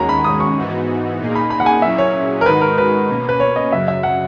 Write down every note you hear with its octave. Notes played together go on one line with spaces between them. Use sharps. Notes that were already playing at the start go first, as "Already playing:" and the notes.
Already playing: D#2 D#3 G#3 C#4 F#4 A#5
B5
D#6
C#6
G#2 E3 B3 D#4 F#4
A#2 A#3 D#4 G#4
B5
B5
F#5
G#5
A#2 F#3 C#4 E4 G#4 E5
C#5
A#4
G#2 D#3 G#3 D#4 F#4 B4
A#4
B4
B2 A#3 C#4
B4
C#5
D#5
F#2 C#3 F#3 E5
E5
F#5